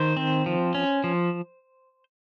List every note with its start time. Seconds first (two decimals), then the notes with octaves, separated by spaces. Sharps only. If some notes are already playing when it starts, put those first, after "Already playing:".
Already playing: D#3 C5
0.17 C4
0.46 F3
0.75 C#4
1.04 F3